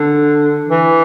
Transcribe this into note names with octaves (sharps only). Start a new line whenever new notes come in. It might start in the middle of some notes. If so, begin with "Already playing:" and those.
Already playing: D3
E3